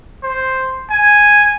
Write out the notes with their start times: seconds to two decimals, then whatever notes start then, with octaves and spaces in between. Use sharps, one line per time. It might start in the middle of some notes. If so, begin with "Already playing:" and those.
0.23 C5
0.90 G#5